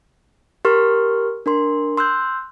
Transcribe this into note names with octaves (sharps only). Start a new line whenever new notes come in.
G4 A#4 C6 C#6 F6
D4 A#4 C6
C6 E6 F#6 G6